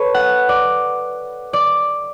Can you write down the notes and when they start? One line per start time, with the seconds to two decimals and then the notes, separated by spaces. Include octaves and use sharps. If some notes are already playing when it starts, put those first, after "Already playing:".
Already playing: A4 B4 C#5
0.14 F#5
0.49 D5
1.53 D5